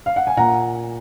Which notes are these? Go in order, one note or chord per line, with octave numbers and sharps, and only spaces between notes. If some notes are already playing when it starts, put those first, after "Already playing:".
F5
F#5
G#5
A#2 F#5 A#5